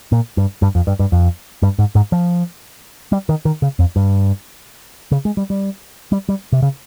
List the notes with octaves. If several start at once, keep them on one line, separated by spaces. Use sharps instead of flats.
A#2
G2
G2
F2
G2
G2
F2
G2
G#2
G#2
F3
G3
D#3
D#3
C#3
F2
G2
C#3
G#3
G3
G3
G3
G3
C3
C#3